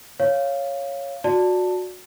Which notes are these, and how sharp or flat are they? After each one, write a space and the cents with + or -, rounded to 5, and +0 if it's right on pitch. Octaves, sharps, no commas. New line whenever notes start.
C#5 +0 F5 -10
F#4 -20 D5 +0 A5 +10